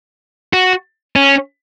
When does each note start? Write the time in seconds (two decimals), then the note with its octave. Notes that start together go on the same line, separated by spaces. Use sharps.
0.53 F#4
1.16 C#4